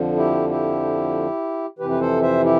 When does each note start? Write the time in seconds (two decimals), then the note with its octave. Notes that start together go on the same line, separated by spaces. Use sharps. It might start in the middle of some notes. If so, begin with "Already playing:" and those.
Already playing: F2 D3 F3
0.16 E4 G4
0.49 E4 G4
1.79 F2 C3 E3 G4 B4
1.90 B4
2.00 A4 C5
2.22 C5 E5
2.44 E4 G4